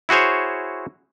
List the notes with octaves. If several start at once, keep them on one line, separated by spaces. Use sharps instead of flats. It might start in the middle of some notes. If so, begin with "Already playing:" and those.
E4 F#4 G#4 C5 C#5